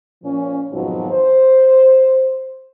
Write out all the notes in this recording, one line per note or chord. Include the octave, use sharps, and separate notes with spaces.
A#2 F3 C#4
F2 G#2 B2 D#3 F3 F#3
C5